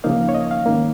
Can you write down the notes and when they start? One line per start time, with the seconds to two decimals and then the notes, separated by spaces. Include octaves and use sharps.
0.04 C#2 C#3 F3 A#3 D#4 F5
0.29 C#5
0.35 D#5
0.51 F5
0.66 G#2 D#3 A#3 C#4